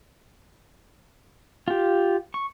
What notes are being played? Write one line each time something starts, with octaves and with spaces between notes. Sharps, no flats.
F4 G4
C#6